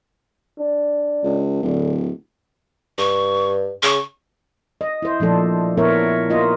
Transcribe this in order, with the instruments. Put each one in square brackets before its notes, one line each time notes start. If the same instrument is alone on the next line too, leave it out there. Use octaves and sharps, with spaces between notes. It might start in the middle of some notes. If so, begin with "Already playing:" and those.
[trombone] D4
[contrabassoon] C#2
[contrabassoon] D1 [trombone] D3
[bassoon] G2 [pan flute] C#6
[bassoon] C#3 [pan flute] C#6
[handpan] D#5
E4 C5
A#2 F3 A3 D4 A4
A#2 B3 E4 A#4 C#5 E5
A#3 D#4 F4 D#5